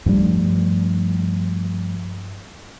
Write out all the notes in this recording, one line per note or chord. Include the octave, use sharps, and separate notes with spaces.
G2 F3 G3 A3